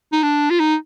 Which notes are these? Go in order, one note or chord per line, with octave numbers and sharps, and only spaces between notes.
D#4
D4
F4
D#4